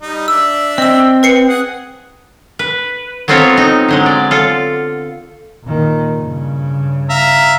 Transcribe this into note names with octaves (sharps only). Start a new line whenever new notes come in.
G3 D#4
D4 E5 E6
C4 D#5 E6
B4 C7 C#7
G#4 F#5
B4
F#3 B3 C4 F4 A4 C#5
D#4
D3 F#3 G#3
D5
F4 A4
A#2 D#3
G2 C#3
E5 F5 A#5